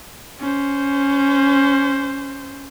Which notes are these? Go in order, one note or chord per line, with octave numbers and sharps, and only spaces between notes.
C#4 C5